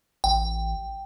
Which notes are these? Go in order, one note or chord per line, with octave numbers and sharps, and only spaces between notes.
A1 G5